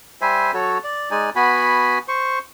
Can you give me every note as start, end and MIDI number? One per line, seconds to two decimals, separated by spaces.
0.21 0.52 55
0.21 0.52 72
0.21 0.52 76
0.21 0.52 80
0.54 0.78 54
0.54 0.78 66
0.54 0.78 69
0.54 0.78 73
0.84 1.10 74
1.11 1.30 56
1.11 1.30 63
1.11 1.30 74
1.11 1.30 80
1.36 1.98 59
1.36 1.98 66
1.36 1.98 80
1.36 1.98 83
2.08 2.39 72
2.08 2.39 85